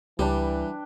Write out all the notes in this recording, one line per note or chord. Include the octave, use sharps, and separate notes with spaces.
C#2 E3 G3 D4 G4 B4 G5